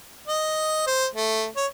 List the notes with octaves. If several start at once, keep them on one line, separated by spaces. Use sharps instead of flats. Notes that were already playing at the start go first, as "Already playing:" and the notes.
D#5
C5
A3
C#5